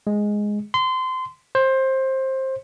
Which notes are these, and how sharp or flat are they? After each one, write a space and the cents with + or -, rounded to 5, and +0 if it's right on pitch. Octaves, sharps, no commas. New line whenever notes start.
G#3 +0
C6 -25
C5 +20